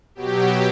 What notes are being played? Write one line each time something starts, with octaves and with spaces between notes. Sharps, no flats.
B2 F#3 G4